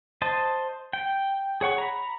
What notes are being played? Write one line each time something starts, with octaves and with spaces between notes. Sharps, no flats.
C5 D#5 A5
G5
G#4 C#5 F#5 C#6
A#5 B5